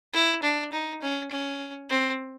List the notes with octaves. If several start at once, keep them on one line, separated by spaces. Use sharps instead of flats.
E4
D4
D#4
C#4
C#4
C4